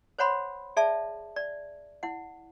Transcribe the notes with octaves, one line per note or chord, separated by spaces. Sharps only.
C5 C#5 F#5 B5 C6
G#4 D5 E5 A5
D5
E4 F#5